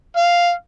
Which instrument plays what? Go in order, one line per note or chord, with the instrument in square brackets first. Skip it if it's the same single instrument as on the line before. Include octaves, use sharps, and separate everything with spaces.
[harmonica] F5